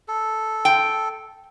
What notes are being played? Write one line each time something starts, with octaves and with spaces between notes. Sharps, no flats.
A4
G5